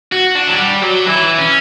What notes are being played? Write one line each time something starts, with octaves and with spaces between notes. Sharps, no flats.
F#4
D4
F#3
G3
F#3
E3
C#4